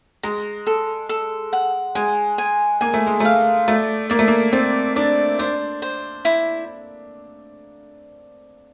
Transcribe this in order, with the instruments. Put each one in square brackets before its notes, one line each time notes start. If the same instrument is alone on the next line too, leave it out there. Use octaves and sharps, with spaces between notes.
[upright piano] G#3 [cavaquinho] A#5
[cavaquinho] A4
A4
F#5
[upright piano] G#3 [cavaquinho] G#5
[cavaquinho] G#5
[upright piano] A#3 [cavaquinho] G#5
[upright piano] A3
G#3
[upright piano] A3 [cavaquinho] F5
[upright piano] A3 [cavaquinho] D5
[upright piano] A#3 [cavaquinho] D5
[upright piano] A3
A#3
[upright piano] C4 [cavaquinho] D5
[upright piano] D4 [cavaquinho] D5
[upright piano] D4 [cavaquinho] C5
[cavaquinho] C5
E4